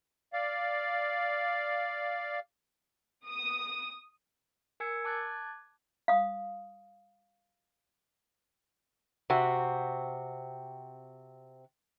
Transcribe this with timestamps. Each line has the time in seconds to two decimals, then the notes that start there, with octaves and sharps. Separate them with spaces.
0.33 D5 F5
3.28 D#6
4.80 A#4 G#5 E6 G#6 C#7
5.05 A5 D6 F#6 G#6 A6
6.08 F5 D#6
9.30 C3 C4 F#4